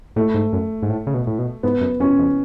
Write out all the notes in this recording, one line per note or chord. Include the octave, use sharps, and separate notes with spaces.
A2 A3
G#2
F#2
G#2
A2
C#3
B2
A2
B2
G#2 B3
F#2
F#2 C#4
F2